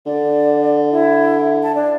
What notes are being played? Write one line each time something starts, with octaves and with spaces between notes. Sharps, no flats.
D3 D5
E4
A5
D4